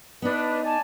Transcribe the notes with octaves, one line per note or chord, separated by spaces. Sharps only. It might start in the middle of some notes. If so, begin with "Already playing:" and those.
B3 D4 D#4 B4
D5 G#5 A5